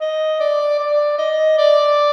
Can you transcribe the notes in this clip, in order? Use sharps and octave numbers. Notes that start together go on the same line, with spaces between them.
D#5
D5
D5
D#5
D5